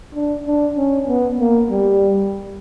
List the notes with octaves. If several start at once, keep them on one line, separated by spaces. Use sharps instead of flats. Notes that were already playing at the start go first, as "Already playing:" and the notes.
D4
D4
C#4
B3
A#3
G3